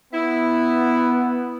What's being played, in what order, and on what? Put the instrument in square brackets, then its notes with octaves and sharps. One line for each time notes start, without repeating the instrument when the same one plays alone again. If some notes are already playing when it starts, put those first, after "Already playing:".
[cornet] B3 [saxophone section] E4